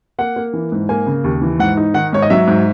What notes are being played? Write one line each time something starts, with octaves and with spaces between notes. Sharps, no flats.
A#3 F#5
A#3
E3
G#2
A#3 G#5
C#3
D#2
E3
G#2 F#5
D#4
D#3 F#5
G#2 C#5
D#5
F#3 E5
G#2